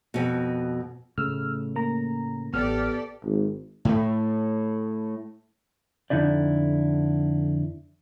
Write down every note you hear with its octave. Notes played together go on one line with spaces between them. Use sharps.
F2 B2
A2 C#3 A3 E6 F6
A#3 A#5
A1 B3 G4 A4 D5 F6
G#1
A2 A3
F2 D3 D#4 E4 D5